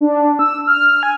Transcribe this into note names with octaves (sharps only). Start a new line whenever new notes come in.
D4
E6
F6
G#5